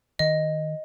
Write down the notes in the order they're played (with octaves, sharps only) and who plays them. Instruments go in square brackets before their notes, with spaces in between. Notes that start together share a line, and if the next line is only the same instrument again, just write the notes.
[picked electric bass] D#3 [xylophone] D#5